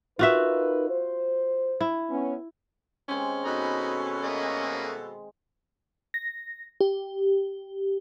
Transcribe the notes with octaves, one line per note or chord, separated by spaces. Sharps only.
D#4 F4 F#4 A#4 B4 E5
C5
E4
B3 C#4
D#3 G#3 C4 C#4
B2 D#4 A4 B5
A3 A#3 D#5
A#6
G4